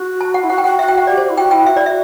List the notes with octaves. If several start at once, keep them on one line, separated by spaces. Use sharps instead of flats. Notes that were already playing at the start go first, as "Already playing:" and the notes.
Already playing: F#4
A5
F#5
E4
F#4 F#5
G5
F#4 F#5
F#4 E5
G5
F#5
G4 D5
C5
E4
F#4 G5
E4 G5
F#4 E5
D5
E5